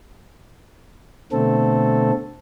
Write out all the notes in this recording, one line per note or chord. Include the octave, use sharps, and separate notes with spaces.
B2 D3 A3 C4 A4